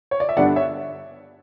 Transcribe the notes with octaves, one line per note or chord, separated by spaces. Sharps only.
C#5
D5
E5
G2 D3 G3 B3 D4 D5 F#5
C#5 E5